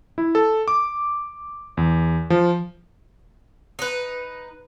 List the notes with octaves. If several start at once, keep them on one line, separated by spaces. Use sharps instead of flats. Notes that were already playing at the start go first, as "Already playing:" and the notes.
E4
A4
D6
E2
F3
D#4 B4